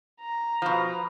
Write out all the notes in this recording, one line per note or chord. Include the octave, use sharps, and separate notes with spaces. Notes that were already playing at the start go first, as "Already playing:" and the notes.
A#5
B2 F3